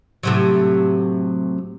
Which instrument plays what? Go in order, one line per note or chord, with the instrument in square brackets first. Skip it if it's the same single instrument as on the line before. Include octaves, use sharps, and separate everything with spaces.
[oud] A2 C3 F#3